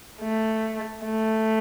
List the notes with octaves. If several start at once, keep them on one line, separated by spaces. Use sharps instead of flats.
A3
A3